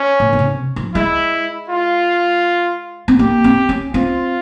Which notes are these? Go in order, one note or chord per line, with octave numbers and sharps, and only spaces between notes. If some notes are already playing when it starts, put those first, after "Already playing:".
Already playing: C#4
A#2
A#2
C3
F3
G#3 E4
F4
C4
A#3 G4
C4
C#4
C4 F4